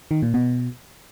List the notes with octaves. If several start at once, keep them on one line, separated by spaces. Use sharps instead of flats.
D#3
A#2
B2